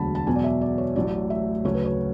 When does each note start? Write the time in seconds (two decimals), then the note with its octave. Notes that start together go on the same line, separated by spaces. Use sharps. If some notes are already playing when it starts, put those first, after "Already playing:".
Already playing: E1 D2 D3 F#3 A5 B5
0.15 A5
0.27 E2 B2 F#3 G#5
0.36 D5
0.44 E5
0.61 D5
0.78 C#5
0.96 A1 A2 F#3 D5
1.30 E5
1.64 D2 C#3 F#3 C#5
1.74 B4
1.85 C#5